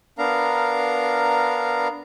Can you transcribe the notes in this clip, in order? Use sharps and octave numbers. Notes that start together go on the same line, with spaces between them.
B3 D4 A#4 F5 A#5